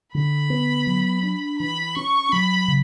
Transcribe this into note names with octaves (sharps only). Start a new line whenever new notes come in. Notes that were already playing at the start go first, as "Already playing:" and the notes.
D3 B5
B3
F#3
D4
E3 B5
C#4 C#6
F#3 B5
C#3